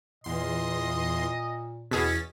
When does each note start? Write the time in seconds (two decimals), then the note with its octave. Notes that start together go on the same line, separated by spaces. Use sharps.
0.24 E2 A#2 D#5 C6
1.91 E2 B2 C#4 G#4 E6 A6 B6